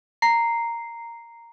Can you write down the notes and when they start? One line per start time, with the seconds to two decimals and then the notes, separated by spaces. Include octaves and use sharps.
0.22 A#5 C7